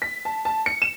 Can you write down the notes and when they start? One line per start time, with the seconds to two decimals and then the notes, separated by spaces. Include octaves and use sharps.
0.02 B6
0.25 A5
0.45 A5
0.66 C#7
0.82 E7